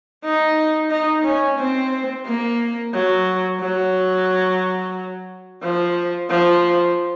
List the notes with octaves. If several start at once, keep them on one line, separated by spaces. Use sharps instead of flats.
D#4
D#4
C#4
C4
A#3
F#3
F#3
F3
F3